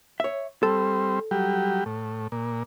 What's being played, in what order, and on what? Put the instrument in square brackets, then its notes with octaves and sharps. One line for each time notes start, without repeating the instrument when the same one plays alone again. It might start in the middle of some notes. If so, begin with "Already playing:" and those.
[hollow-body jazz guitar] C#5 E5
[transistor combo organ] G3 C4 [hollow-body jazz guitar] A4
[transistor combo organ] F#3 G3 G4
A2
A#2